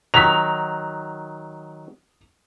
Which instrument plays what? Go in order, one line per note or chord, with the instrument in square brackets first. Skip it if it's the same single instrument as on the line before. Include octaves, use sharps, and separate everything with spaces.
[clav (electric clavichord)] D#3 F#3 [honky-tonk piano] B6 F7